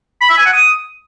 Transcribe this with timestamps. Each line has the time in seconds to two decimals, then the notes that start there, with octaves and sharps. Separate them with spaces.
0.21 B5
0.29 E5
0.37 G#5
0.45 F#5
0.53 D#6